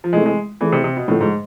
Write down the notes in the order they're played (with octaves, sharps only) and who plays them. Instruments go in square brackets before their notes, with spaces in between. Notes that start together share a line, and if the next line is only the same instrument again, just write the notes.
[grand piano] F3
[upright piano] C3 E3 A3 [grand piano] G#3
[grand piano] G#3
[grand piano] E3 [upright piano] A3 E4 G#4 D5
[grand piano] C3
C3
B2
[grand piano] A2 [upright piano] D3 F3 A3
[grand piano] G#2